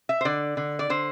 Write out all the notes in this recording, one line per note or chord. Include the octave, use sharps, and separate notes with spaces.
E5
C5
D3 D5
D3
D5
D3 C5